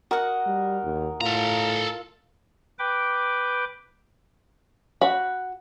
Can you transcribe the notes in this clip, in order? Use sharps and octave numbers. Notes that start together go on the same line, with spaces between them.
F#4 A#4 D#5 F#5
G3
D#2
A2 F4 A4 A#5
B4 G5 D6
F#4 B5